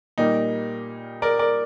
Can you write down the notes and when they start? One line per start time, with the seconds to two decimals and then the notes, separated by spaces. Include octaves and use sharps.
0.18 A#2 G3 A#3 D#4
1.22 A#4 D5
1.39 A#4 D5